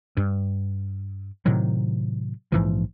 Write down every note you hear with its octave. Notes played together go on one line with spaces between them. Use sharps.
G2
A2 C3 D#3 F#3
A#1 G#2 E3 F3